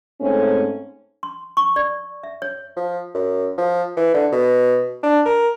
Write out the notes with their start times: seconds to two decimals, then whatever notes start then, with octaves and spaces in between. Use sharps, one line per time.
0.21 G#2 A3 C4 C#4
1.23 C6
1.57 C#6
1.76 D5
2.23 E5
2.42 C#5
2.77 F3
3.15 F#2
3.58 F3
3.97 E3
4.14 D3
4.32 B2
5.03 D4
5.26 A#4